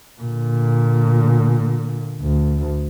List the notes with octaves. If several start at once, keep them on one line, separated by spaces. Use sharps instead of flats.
A#2 D3
D2